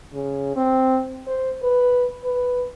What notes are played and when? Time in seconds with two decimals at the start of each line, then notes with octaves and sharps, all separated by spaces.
0.13 C#3
0.56 C4
1.27 C5
1.63 B4
2.24 B4